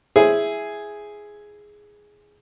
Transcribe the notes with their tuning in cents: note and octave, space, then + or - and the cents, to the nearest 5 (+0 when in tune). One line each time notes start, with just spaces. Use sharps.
E4 +0 G#4 +0 C5 +0